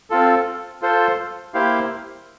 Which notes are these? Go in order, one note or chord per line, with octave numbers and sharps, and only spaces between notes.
C4 F4 A4
F4 A4 C5
A#3 E4 G4 C5 F5